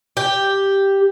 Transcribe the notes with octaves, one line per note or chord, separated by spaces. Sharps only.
G4